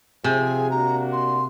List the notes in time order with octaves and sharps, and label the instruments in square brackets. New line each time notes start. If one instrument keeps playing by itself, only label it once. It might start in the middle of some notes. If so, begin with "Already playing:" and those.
[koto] C3 [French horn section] F3 C4 G#4 [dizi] G#5
[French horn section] A#3 D4 F#4 [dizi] A#5
[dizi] C6